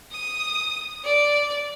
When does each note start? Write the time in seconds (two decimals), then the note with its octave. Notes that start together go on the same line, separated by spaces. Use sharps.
0.12 D#6
1.04 D5